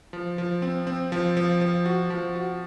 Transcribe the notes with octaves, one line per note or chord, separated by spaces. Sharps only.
F3
F3
C4
C4
F3
F3
F3
F#4
F3
F#4